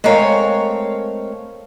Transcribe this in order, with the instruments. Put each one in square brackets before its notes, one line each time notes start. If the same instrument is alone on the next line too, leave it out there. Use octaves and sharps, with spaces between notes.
[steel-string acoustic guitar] G#3 A3 C4 A#4 C#5 F5